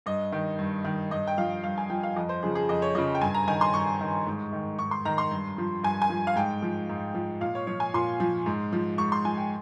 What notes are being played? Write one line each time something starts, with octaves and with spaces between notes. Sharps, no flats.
G2 D#5
D#3
G2
D#3
G2 D#5
G5
F3 F5
G2 F5
G#5
F3 G5
F5
F2 D#5
C5
C#3 F3 G#4
G#4
F2 D#5
C#5
C#3 F3 D#5
G5
G2 G#5
A#5
D#3 G#5
C6
G2 C#6
D#3
G#2
D#3
G#2 C#6
C6
D#3 A#5
C6
G2
F3
G2 G#5
G#5
F3
F5
G#2 G5
F3
G#2
F3
A#2 F5
C#5
F3 C#5
G#5
A#2 C6
F3
G#2
F3
G#2 C#6
C6
F3 G#5
G5